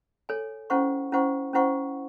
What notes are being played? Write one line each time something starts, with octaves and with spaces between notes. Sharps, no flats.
A4 C#5 G#5
C#4 E4 C5 F#5 C#6
C#4 E4 C5 F#5 C#6
C#4 E4 C5 F#5 C#6